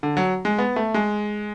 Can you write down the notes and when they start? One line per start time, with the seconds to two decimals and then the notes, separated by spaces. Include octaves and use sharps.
0.03 D3
0.17 F#3
0.45 G#3
0.58 B3
0.76 A3
0.94 G#3